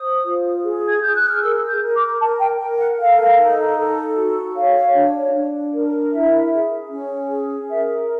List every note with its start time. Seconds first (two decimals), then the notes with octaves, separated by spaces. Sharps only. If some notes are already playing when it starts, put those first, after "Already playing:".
Already playing: C5 D#6
0.24 F4
0.63 G#4
0.88 G#6
1.02 G#4 G6
1.15 F#6
1.29 F6
1.42 A#4 E6
1.68 G6
1.81 A#4
1.94 D6
2.20 A#4 A5
2.40 G5
2.59 A#4 G5
2.79 F#5
2.99 A4 F5
3.38 D#4
3.77 A4
4.16 F#4
4.56 C#5 F5
4.94 D4
5.34 D4
5.73 A#4
6.12 E4 E5
6.52 G#4
6.91 C#4
7.30 G#4
7.69 A#4 E5